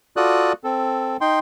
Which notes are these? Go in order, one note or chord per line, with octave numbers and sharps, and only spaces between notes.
F4 F#4 A4 D5 D#6 F#6
C4 A4
D#4 G5 C6